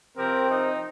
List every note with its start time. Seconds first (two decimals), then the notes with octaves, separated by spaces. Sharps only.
0.16 C3 F3 C4 G4 A#4
0.49 D#4